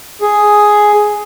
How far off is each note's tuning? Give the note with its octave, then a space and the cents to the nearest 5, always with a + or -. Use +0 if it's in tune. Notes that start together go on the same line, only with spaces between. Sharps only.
G#4 +5